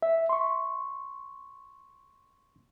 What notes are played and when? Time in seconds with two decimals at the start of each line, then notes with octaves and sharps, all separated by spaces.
0.02 E5
0.29 C6 C#6